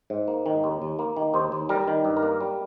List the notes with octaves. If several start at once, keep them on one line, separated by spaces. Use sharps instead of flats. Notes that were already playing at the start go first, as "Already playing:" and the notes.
G#2
A#3
D#3
D#2
D#2
A#3
D#3
D#2 C5
D#2
G3 A#4
D#3
G2
A#4
A#3
G3